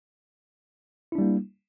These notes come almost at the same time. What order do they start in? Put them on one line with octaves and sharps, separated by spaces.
E4 D4 G3 A#3